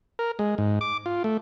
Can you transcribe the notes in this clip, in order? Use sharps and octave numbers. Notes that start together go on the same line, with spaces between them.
A#4
G#3
G#2
D6
F4
A3